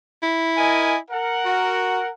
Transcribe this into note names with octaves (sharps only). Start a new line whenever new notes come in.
E4
A#4 D#5 G#5
A#4 F#5
F#4